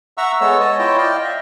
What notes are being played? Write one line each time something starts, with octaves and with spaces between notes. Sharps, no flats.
E5 F#5 A#5 C#6 E6
G#3 B3 A4 C#5 E6
C#5 D#5 A5 D#6
E4 F4 C#5 D#5 G5 A5
D5 D#5 F5 G5
D#5 E5